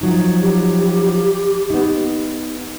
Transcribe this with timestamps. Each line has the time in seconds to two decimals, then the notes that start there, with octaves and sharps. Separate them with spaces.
0.01 F3 F#3 D#4
0.41 G4
1.70 B3 D#4